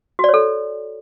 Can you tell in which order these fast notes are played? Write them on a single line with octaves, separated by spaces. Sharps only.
F#4 D5 C#5 A4